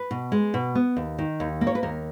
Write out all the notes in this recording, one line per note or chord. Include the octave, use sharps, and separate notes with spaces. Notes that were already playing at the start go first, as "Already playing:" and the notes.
Already playing: B4
B2
G#3
B2
B3
D#2
D#3
D#2
A#3
C#5
B4
D#2 A#4